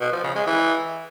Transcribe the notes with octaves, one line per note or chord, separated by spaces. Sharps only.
B2
F3
C#3
G#3
E3